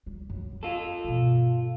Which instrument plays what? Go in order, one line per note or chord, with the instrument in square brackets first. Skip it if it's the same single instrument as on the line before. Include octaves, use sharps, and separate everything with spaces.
[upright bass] G3
F#2
[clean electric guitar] F4 A4
[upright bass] G2 B2